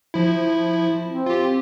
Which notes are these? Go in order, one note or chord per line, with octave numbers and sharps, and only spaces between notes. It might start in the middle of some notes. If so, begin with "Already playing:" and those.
F3 E4
C4
F4 G4